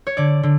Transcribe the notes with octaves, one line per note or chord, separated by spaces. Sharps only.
C#5
D3 D5
D3